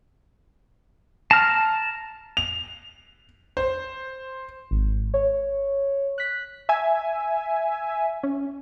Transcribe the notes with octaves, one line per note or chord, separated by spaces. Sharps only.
A5 A#5 F6
F7
C5
G#1
C#5
F#6 B6
E5 G#5
C#4